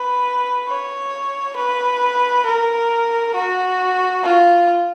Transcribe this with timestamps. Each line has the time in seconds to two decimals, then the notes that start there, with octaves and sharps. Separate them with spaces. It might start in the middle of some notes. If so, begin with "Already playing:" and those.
Already playing: B4
0.68 C#5
1.57 B4
2.45 A#4
3.35 F#4
4.23 F4